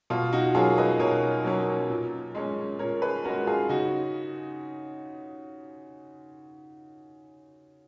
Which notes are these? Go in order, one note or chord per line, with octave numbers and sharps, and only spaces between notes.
B2 F4
D#4 F#4
F#3 A#3 C#4 F4 G#4
B4 D#5
B2 A#4 C#5
F#3 A#3 C#4
A#2
G#3 C#4
A#2 A#4 C#5
G#4 B4
G#3 C#4 F#4 A#4
F4 G#4
C#3 D#4 F#4